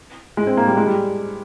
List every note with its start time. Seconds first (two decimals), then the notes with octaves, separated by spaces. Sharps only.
0.37 G#3
0.47 C4
0.57 A#3
0.67 G3
0.77 G#3
0.86 G3